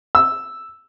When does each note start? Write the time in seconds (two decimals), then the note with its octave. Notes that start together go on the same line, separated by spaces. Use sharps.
0.15 E6